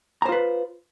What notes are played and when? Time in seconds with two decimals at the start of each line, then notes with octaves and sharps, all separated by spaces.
0.22 A#5
0.25 C5
0.29 F4
0.32 B4